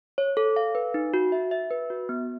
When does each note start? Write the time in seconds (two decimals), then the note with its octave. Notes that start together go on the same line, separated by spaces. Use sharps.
0.18 C#5
0.37 A4
0.56 F5
0.75 B4
0.94 D#4
1.14 F#4
1.32 E5
1.51 E5
1.71 B4
1.90 F#4
2.09 B3